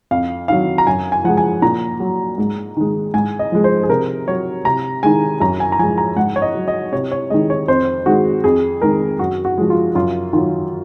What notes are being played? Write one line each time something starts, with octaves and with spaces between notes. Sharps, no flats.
F2 F5
D#3 F#3 F5
A#5
F#2 G#5
G#5
F3 G#3 F#5
G#5
A#2 A#5
F#3
G#2
D#3 G#3
G#2 G#5
D#5
F3 G#3
C5
G#4
C3 A#4
F#3 C#5
C3 A#5
D#3 G#3 G#5
F#2 A#5
G#5
A#5
F3 G#3 G#5
A#5
G#2 F#5
C#5
D#5
F#3
D#5
C3 C#5
C#5
D#3 G#3 D#5
C#5
F2 C5
D#3 G#3 F#4
F2 G#4
D#3 G#3 A#4
F#2 F#4
F#4
F3 G#3
F4
F#2 F4
D#3 F#3 F4